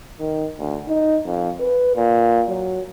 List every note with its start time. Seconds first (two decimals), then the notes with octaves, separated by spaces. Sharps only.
0.20 D#3
0.59 D2
0.88 D#4
1.25 F2
1.60 B4
1.96 A#2
2.49 F#3